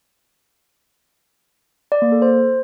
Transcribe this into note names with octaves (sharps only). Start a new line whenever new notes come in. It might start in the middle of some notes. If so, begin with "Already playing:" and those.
D5
A#3
A4
C5